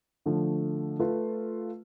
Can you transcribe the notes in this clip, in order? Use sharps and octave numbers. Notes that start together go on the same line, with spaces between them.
D3 F3 A3
A3 F4 B4